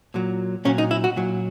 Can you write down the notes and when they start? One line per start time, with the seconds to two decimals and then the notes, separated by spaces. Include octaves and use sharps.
0.14 A#2 F#3
0.65 A#2 F#3 C#4
0.78 D#4
0.91 E4
1.04 F#4
1.16 A#2 F#3